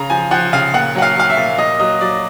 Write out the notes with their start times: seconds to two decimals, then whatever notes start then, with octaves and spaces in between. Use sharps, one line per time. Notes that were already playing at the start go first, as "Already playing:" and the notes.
Already playing: C#3 A#5
0.10 F3 G#5
0.31 F3 F#5
0.53 C#3 F5
0.74 A#2 F#5
0.95 F#3 F#5
1.02 F5
1.17 F#3 F5
1.30 E5
1.37 A#2
1.58 A#2 D#5
1.80 F#3 D#5
2.01 F#3 D5